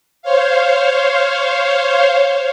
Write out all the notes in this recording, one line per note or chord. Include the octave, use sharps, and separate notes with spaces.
C5 C#5 F5